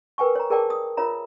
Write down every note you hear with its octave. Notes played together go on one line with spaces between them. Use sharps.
A#4 B4 G5 G#5 C#6
C#5 A#5
G#4 A#4 D5 G5 A5 D6
D#6
F4 A#4 C#5 E5 A#5